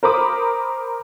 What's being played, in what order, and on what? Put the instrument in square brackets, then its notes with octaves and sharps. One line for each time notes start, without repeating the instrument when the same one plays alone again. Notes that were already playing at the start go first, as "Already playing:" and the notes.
[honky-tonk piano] A#4 C5 A#5 B5 D6 D#6